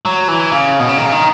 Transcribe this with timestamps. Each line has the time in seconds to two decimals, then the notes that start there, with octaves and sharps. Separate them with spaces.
0.05 F#3
0.28 E3
0.52 C#3
0.80 B2
0.89 C#3
0.98 D#3
1.06 C#3
1.12 D#3